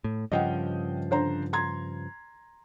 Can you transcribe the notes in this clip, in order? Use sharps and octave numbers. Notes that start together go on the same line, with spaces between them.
A2
G2 C#3 F3 D#5 F#5 G5
D3 C5 A#5
A#5 C6 G#6